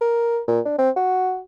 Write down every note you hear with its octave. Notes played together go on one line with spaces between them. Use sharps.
A#4
A#2
D4
C4
F#4